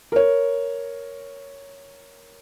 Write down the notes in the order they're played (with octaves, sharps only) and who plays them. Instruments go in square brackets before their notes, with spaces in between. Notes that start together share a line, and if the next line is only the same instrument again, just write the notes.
[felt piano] A#4 C#5